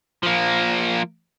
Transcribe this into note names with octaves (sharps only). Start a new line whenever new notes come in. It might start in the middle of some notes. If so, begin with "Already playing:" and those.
F3 A#3